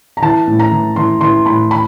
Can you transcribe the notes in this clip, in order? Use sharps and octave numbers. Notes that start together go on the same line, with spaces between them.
A#5
E3 A5
A2
A#5
E3
E3 C6
E3 C6
A2 B5
B5